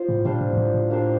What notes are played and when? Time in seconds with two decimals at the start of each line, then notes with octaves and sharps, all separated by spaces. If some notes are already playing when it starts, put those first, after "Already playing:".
Already playing: F4 C5
0.09 A2
0.25 A#2 G3 D4 F4 C5
0.41 A2
0.53 G2
0.57 A2
0.74 A2
0.90 A#3 D4 G4 C5